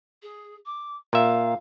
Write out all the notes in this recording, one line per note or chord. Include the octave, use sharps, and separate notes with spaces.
G#4
D6
A#2 E5 F5